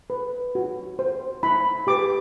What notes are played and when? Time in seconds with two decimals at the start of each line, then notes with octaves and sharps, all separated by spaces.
0.10 B4
0.55 F#4
0.99 C5
1.43 E4 B5
1.87 G4 B4 D6